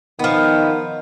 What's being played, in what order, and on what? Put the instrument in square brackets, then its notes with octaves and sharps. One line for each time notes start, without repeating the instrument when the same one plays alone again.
[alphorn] D#3 [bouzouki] F3 B3